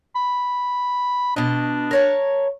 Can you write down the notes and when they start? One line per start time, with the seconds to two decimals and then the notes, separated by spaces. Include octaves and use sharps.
0.16 B5
1.36 B2 D4 D#5
1.91 A#4 C#5 A5